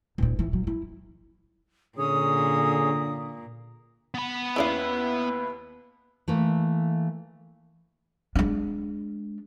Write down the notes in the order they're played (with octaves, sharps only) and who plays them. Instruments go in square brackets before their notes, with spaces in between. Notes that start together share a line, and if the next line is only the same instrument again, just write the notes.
[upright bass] D#1 A#2
E3
F#3
E4
[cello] A#2 [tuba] D3 [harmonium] C#4 G#4 C#5 [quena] D#6
[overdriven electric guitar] B3 B5
[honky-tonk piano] D#2 E4 [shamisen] C#4 D5 F5 [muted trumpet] B4
[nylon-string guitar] E3 A3 A#3
[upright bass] G#3 D4